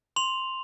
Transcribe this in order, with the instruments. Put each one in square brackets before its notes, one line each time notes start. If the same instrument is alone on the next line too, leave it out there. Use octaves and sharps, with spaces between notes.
[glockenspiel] C6 F7